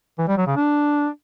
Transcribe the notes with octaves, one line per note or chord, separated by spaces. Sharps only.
E3
G3
F#3
C#3
D4